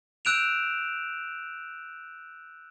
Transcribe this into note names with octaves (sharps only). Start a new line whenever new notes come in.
E6 F#6 G6 D7 E7 F7